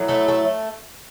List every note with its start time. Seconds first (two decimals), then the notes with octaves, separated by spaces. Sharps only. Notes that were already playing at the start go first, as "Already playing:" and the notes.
Already playing: A2 F#3
0.08 A3 A4
0.28 A3 A4